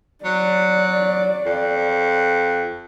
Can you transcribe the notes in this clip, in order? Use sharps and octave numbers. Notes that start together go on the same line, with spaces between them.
F#3 D5
F2